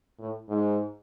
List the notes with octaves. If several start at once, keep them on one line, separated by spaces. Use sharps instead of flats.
A2
G#2